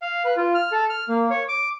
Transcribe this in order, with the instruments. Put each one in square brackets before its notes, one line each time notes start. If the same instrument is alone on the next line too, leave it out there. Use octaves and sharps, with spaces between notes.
[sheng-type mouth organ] F5
B4
F4
F6
A4
F6
A#3
C#5
D6